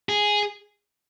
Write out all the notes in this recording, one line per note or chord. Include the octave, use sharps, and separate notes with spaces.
G#4